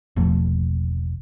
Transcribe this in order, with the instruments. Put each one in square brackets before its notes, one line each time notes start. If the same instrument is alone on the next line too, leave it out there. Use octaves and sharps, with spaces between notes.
[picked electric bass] E1 A1 F3 A3